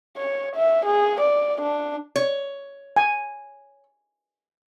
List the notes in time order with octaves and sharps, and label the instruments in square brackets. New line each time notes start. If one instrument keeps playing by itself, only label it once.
[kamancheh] C#5
E5
G#4
D5
D4
[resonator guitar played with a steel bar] C#5
[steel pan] G#5